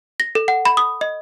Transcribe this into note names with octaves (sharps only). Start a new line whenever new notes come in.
A#6
A4
F#5
B5
D#6
D#5